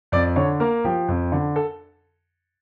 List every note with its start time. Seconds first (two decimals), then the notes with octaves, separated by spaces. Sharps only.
0.12 F2 D5
0.36 D3 C#5
0.60 A#3 A#4
0.84 F3 G4
1.08 F2
1.32 D3
1.56 A4